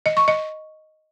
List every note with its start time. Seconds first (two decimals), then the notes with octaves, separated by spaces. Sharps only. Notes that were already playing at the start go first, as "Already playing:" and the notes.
0.06 D#5
0.17 C#6
0.28 D#5